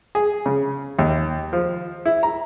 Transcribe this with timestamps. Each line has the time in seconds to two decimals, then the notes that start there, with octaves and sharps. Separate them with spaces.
0.15 G#4
0.46 C#3
0.99 D#2
1.53 F3
2.06 E4
2.23 A#5